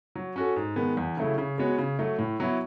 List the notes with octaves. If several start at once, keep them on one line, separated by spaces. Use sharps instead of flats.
F#3
C#4 F#4 A4
G#2
D#3 G#3 B3
E2
C#3 F#3 A3 E4
C#3
G#3 B3 F#4 C#5
C#3
F#3 A3
A2
F#3 B3 E4